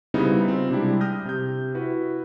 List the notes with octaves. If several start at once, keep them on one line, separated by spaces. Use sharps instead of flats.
C#3 G3 B3 C4 D#4 E4
C4 F4
C3 G3 G#3 D4 E4 G4
D#6 F6 G6 A#6
C3 G6
E4 F#4 B4